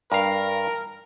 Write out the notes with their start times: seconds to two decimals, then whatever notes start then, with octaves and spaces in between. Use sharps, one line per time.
0.12 G2 A#4 F5